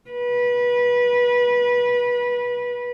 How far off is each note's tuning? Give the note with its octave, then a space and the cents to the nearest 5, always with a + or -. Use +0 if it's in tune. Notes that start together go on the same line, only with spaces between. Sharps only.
B4 -20